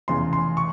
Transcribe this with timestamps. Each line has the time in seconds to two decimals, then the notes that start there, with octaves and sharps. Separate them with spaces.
0.08 F1 E2 C#3 C6
0.33 C6
0.57 C#6